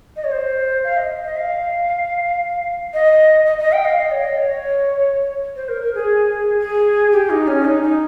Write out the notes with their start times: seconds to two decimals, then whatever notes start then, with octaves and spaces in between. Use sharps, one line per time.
0.16 D#5
0.24 C#5
0.32 C5
0.84 F5
0.97 D#5
1.24 D#5
1.37 F5
2.94 D#5
3.46 D#5
3.59 D#5
3.72 G5
3.85 F5
3.98 D#5
4.11 C#5
4.25 D#5
4.37 C#5
5.56 C5
5.68 A#4
5.82 A#4
5.95 G#4
6.60 G#4
7.12 G4
7.30 D#4
7.47 C#4
7.65 D#4
7.82 D#4